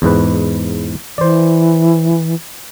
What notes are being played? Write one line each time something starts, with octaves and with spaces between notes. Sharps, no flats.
E2 G#2 B4
E3 C5 D5